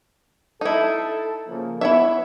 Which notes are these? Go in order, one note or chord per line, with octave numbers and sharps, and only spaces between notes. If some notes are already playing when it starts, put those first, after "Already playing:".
D#4 E4 A4
C#3 F3 A#3
B3 E4 C#5 E5